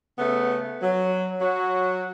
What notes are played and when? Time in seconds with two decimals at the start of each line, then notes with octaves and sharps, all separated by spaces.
0.18 C#3 A3 B3
0.82 F#3
1.41 F#3 F#4